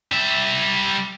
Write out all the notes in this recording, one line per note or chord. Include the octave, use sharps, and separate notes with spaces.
G3 E5